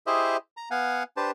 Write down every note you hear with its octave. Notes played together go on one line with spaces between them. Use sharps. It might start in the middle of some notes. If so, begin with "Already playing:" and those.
E4 G4 G#4 C5 D#5 E5
A#5
B3 F5 F#5 G#5
D4 G4 B4 C5 A5